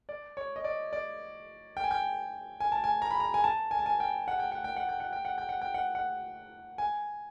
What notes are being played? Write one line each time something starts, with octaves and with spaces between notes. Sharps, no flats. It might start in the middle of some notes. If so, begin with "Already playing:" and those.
D5
C#5
D#5
D5
D5
G5
G#5
G5
G#5
A5
G#5
A#5
B5
A#5
G#5
A5
G#5
A5
G#5
G5
F#5
G5
F#5
G5
F#5
G5
F#5
G5
F#5
G5
F#5
G5
F#5
F#5
G#5